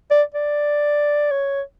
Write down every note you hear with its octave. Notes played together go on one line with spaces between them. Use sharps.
D5
D5
C#5